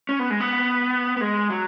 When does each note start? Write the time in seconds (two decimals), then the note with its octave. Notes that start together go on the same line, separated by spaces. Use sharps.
0.09 C#4
0.19 B3
0.30 G#3
0.40 B3
1.16 B3
1.21 G#3
1.50 F#3